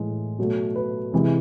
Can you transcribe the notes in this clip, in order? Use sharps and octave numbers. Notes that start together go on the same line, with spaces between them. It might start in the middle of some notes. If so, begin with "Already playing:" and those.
Already playing: A2 E3 G#3
B2 F#3 A3
B4
C3 E3 G#3